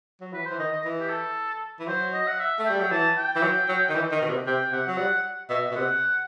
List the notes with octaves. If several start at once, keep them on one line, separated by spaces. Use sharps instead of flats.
F#3
E3 B4
C5
E3
D#3 D#5
D#5
E3
G4
A4
E3
F#3 C5
D#5
F#5
E5
A3
G3 G5
F#3
E3 A5
G5
E3
F#3
F#3
D#3
E3
D#3
B2
C3
C3 G5
C3 F#5
F#3
G3
B2 E5
B2
C3 F#5